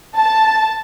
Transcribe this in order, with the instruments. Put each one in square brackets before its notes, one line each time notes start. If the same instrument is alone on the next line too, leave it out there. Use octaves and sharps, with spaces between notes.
[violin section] A5